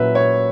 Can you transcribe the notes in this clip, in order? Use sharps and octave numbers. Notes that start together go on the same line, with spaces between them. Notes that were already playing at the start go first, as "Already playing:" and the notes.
Already playing: A#2 F#3 C#4 E4 B4 E5
C#5